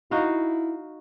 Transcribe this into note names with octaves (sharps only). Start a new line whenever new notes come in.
D#4 E4 F#4 F5